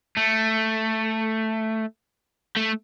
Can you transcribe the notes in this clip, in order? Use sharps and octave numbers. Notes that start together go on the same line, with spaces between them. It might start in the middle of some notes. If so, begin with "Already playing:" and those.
A3
A3